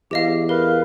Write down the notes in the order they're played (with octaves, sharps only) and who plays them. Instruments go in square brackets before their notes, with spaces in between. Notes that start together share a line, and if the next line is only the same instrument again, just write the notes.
[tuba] E2 [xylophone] G4 D#5 F5
[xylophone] A#4 [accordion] B4 F5